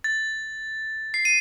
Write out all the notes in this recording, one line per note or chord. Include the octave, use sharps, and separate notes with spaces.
A6
C7
D#7